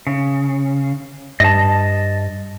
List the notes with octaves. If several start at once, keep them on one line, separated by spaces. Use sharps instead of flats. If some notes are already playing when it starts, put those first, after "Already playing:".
C#3
G2 D#5 A5